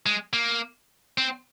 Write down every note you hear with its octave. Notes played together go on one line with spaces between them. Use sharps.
G#3
A#3
C4